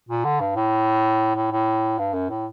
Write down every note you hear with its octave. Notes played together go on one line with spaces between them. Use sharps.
A#2
D3
G2
A2
A2
A2
G2
F#2
A2